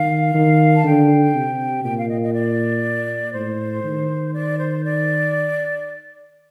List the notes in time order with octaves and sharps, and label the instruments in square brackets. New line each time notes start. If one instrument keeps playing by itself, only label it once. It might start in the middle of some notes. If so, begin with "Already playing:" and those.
Already playing: [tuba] D#3 [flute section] F5
[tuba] D#3
[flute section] A5
[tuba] D3 [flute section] G5
[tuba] C3
[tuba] A#2 [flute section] G5
[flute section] F5
D#5
D#5
D5
[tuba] A2 [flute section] C5
[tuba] D#3
[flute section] D5
C5
D5